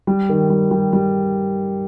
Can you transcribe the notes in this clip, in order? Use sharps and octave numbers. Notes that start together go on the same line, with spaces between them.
G3
D#3
G3
G3
G3